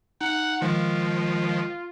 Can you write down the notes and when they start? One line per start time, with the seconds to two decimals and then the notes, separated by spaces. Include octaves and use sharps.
0.21 D#4 F#5
0.62 D#3 F3 G#3 F4